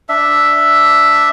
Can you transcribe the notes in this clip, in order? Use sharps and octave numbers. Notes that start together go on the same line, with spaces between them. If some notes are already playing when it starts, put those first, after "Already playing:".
D4 E5